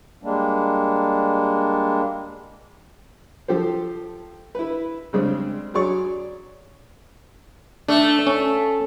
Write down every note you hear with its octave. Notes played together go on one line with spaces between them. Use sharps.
G3 G#3 A#3 D4
F3 G4 A4 C5
E4 B4
C#3 G3 G#3 C4 D4
F#3 G#4 C#5 D5 C#6
A3 D4
C#4